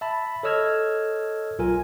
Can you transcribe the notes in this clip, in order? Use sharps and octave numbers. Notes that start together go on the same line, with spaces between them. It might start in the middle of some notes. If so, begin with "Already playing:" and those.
E5 A5 B5
A4 C#5 D#5 E6 F6 G#6
B1 F4 A#4 G#5